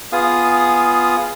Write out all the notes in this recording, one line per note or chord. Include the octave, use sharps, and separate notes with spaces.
B3 F4 G#4 F5 D#6